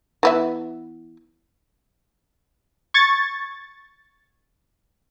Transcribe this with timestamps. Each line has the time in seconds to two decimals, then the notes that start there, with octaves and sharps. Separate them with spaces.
0.23 E3 B3 E5
2.94 C#6 G#6 A6